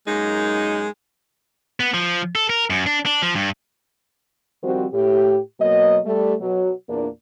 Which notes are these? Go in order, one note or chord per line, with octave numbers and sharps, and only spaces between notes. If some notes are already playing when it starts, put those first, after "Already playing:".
F#2 G#3 A#3 D#4
B3
F3
A4
A#4
F#2
D4
D4
F3
G2
D#3 F3 G3 C4 F#4 C5
A2 G4
B2 F#3 A#3 D#5
G3 A3
B2 F#3
E2 A#2 A#3 D4